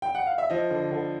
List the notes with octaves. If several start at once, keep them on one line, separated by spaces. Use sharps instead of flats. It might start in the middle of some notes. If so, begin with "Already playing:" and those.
G5
F#5
F5
E5
F3 D#5
D3
D3